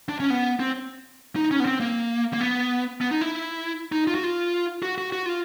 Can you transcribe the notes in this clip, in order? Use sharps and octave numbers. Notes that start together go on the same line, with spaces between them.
D4
C#4
B3
C4
D#4
C#4
B3
C4
A#3
A#3
B3
B3
D#4
E4
D#4
F4
F#4
F4
F#4
F#4
F#4
F4